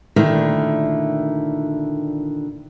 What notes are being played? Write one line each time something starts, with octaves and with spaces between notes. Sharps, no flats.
A#2 D3 D#3 A3 E4